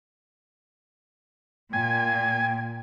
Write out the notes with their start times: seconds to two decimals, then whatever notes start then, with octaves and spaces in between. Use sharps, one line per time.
1.73 A#2 G5 G#5